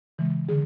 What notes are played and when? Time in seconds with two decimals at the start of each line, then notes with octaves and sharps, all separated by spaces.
0.18 C#3 E3 G#3
0.49 D3 G#4